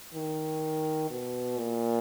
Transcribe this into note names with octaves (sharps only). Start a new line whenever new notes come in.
D#3
B2
A#2